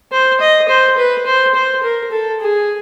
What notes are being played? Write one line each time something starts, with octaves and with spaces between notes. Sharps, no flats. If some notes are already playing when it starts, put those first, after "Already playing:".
C5
D#5
C5
B4
C5
C5
A#4
A4
G#4